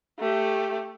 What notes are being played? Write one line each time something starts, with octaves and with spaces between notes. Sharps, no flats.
A3 G4